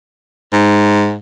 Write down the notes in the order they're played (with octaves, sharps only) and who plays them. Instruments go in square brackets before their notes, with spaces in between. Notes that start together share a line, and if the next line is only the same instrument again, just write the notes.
[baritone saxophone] G#2